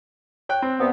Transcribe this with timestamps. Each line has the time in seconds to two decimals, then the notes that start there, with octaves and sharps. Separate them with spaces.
0.49 C#5 G5 F#6
0.62 C4
0.79 G2 C3 B3